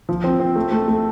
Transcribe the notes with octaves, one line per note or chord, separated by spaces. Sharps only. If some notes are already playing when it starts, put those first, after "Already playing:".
F3
C4
C4
A3
A3
A3